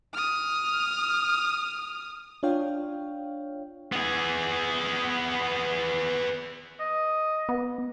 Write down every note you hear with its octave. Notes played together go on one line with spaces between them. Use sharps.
D#6 F6
D4 F4 C#5 F5 G5
B3 G#4
D#5
B3